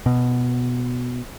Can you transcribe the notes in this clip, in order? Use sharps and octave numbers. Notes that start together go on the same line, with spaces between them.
B2